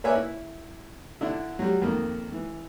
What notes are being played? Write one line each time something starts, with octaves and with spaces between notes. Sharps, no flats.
A#3 B4 C#5 D5 E5 G#5
E4
D3 D4 E4
F#3 G3
F2 D#3 A#3
E3